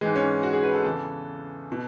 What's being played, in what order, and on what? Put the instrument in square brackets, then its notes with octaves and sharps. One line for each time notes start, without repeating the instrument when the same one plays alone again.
[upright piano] G#2 E3 G#3
C#4
F#4
G#4
B4
A4
E2 C#3 E3 A4
B2